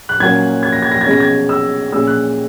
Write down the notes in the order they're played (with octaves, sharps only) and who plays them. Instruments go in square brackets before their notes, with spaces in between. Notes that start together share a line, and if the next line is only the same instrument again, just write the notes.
[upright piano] F#6
A#2 F#3 A#3 C#4 G#6
G#6
A#6
G#6
A#6
G#6
B2 G#3 C#4 A#6
G#6
E6
A#2 G#3 C#4 E6
F#6